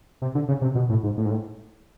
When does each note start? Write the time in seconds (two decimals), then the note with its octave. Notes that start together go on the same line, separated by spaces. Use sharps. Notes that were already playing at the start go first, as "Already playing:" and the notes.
0.22 C3
0.35 D3
0.48 C#3
0.62 C3
0.75 B2
0.90 A2
1.03 G#2
1.17 A2
1.25 G#2
1.31 A2